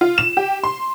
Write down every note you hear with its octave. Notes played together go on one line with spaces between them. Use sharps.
F4
E7
G4
C6